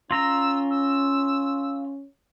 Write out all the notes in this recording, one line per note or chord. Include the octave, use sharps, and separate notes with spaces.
C#4 F4 A#5 E6
E6